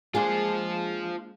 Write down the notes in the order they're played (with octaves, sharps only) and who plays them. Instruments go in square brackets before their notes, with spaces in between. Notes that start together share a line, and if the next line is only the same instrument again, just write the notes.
[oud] G#3 A#3 D4 [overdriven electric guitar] F4 C5 [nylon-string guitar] G#4